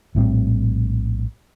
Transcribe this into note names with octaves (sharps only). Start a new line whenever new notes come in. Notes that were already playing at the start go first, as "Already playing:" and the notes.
A#1 A2 G3 C4